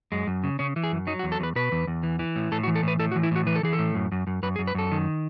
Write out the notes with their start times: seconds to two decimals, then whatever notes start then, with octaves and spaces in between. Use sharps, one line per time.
0.12 F#2 G#3
0.27 F#2
0.44 C#3
0.59 C#3 C#4
0.76 E3
0.83 G#4
0.92 F#2
1.07 F#3 D#4
1.19 F#4
1.23 E2
1.32 A4
1.40 E2 B4
1.56 B2 B4
1.72 E2
1.87 E2
2.03 E3
2.19 E3
2.36 A2
2.52 A2 A4
2.63 F#4
2.67 E3
2.75 A4
2.83 A2 B4
2.99 A2 A4
3.12 F#4
3.16 E3
3.23 E4
3.31 A2 F#4
3.47 E3 B4
3.56 A4
3.63 E3 G#4
3.73 A4
3.79 A2
3.95 F#2
4.12 F#2
4.27 F#2
4.43 F#2 B4
4.56 G#4
4.59 F#2
4.67 B4
4.75 F#2 A4
4.92 D#3